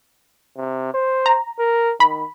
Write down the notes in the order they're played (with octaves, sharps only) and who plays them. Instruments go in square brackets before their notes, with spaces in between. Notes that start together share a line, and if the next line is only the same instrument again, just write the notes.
[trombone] C3
C5
[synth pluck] A#5
[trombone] A#4
[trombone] D#3 [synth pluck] B5